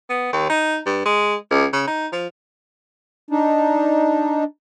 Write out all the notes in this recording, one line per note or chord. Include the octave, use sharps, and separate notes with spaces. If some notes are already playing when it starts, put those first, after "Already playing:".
B3
D#2
D#4
G2
G#3
C#2
C#3
D#4
F3
D4 D#4